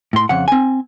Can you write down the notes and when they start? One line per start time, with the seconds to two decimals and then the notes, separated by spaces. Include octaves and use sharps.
0.13 A2 C6
0.29 F2 C#3 F#5
0.48 C4 G#5